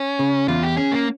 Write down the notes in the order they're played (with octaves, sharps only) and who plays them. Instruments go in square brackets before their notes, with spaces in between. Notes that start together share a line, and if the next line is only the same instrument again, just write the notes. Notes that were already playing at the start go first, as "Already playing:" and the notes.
Already playing: [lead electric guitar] C#4
[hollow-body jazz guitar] C#3
[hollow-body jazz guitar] E2 [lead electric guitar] F4
[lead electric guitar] G4
[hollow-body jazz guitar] C#4 [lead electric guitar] G#4
[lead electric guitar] A#3